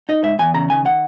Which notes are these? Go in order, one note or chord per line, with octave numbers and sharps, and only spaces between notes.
D#4 D#5
G#2 E5
E2 G#5
C#3 A#5
D#3 G#5
D#3 F#5